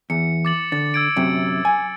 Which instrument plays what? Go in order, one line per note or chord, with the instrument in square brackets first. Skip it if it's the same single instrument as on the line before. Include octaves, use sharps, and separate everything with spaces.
[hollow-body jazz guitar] E2 [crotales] C#7
[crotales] D6 A6 F#7
[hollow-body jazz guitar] D3 [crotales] A6
[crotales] E6 G#6 D7
[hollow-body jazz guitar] F#2 C3
G#5